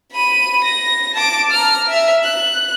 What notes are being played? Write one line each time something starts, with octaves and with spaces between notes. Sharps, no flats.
B5 D#7
A#6
A5 D6
A#5 F6
E5
F#6